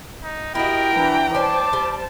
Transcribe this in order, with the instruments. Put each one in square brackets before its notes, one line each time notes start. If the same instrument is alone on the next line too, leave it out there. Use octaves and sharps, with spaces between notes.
[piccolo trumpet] D#4
[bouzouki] E4 F#4 [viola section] G4 D#5 [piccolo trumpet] A#4 [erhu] G5
[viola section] E3 D4 A#5
[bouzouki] C#4 D4 [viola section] C5 A5 [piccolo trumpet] D6
[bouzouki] G3